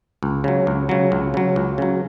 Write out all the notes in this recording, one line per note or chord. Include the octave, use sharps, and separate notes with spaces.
C#2
C#3 F#3
C#2
C#3 F#3
C#2
C#3 F#3
C#2
C#3 F#3